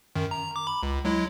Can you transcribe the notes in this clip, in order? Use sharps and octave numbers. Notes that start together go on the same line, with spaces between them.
F#2 D#3
A#5
D6
B5
C#2
F#3 G#3 E4